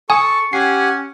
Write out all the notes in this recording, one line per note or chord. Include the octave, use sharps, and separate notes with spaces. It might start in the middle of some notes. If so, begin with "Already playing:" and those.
A4 G#5 A5 C#6 D#6
C#4 G4 F#5 G#5 C7